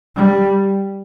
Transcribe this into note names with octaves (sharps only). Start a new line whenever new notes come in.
G3